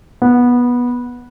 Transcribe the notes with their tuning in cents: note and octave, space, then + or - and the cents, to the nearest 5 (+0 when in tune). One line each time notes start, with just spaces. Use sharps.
B3 -15